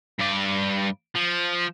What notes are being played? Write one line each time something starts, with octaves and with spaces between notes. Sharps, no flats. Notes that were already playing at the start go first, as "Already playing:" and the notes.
G2 D5
F3